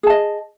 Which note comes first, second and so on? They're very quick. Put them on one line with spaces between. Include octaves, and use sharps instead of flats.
G#4 A5 D#5